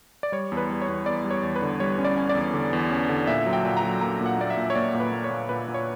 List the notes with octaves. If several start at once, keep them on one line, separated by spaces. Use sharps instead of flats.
D5
G3 C#5
E2
B4
G3
C#5
E2
E2 D5
G3
C#5
E2
B4
D3
G3 C#5
C#4
D5
C#4
D5
E2
D3
E2
C#4
D3
A#2 E5
F#3
G5
A#2
A#5
F#3
A#3 A#5
A#2 F#5
A#3 D5
E5
A#2
C#5
A#3 D5
A#2
B4
A#3
C#5
A#2
A#2 B4
A#2
C#5